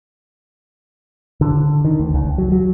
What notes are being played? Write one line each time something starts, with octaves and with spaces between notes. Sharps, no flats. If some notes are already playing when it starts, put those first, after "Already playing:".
D3
D#3
D2
C#2
F#3
F#3